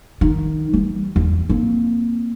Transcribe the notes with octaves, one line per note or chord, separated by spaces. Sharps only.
D#3
E3 G3
E2
A#3 C4